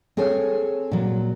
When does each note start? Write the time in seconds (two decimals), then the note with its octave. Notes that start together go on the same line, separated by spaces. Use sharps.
0.17 C4 G#4 A4 C#5 G#5
0.91 A#2 F#3